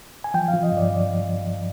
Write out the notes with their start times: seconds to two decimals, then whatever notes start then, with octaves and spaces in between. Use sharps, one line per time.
0.24 G#5
0.34 F3 G5
0.48 F5
0.53 F3
0.63 D#5
0.72 G2 D5